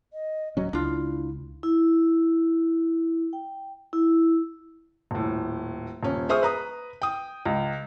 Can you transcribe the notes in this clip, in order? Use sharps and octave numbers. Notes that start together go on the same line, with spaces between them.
D#5
D1 F#3 C#4 D#5
C#2 D4 E4 F4
E4
G5
E4
D#1 A2
D#1 C#4
G#4 C5 E5 C#6 D#6 F6
B4 A#5 D#6
G5 D#6
C#2